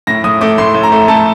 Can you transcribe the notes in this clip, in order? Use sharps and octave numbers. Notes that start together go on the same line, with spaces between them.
A2 A#6
A2 D#6
A3 D6
A2 C6
A2
A#5
A3
A3 A5